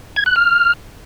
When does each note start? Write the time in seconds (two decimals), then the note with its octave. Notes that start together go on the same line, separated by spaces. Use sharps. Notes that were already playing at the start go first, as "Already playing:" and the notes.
0.16 G#6
0.26 F#6
0.36 F6